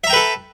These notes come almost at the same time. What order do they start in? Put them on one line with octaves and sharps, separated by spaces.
E5 A#5 G5 B4 A4